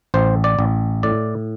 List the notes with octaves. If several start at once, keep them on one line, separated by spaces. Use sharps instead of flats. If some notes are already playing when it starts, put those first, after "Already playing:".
A1 C5
D5
A1
A2 D5